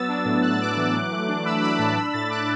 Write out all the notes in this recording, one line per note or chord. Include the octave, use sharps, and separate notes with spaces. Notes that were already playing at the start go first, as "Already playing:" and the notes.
Already playing: F#3 B3 E6 A6
D4
A2
D4 F#6
A6
A2 D6 F#6
E3
F#3
A3
D4
D4 B5 E6
F#3 B5 E6
A2 A5 D6
D4 B5 E6
A2 E6 A6
A2 D6 F#6